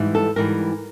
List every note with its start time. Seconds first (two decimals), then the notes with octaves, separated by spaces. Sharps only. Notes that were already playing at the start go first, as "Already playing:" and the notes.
Already playing: G#2 E3 G3
0.15 A4
0.36 G#2 E3 G3 A#4